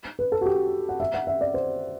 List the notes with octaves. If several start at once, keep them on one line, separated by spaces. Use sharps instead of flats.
B4
A4
F#4
G4
F#5
E5
F#5
E5
D5
C5